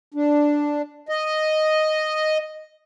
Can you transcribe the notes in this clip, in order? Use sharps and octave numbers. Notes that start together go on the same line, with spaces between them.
D4
D#5